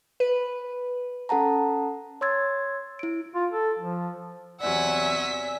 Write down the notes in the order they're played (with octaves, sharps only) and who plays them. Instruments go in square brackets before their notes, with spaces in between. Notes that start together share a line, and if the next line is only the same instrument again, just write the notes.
[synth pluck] B4
[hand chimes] C#4 A4 F#5 A5 A#5
C#5 C6 E6 G#6 A6
E4 D7
[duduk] F4
A4
F3
[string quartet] E2 C3 F#3 [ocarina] D5 [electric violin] E5 B6 [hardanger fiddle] F#5 G#5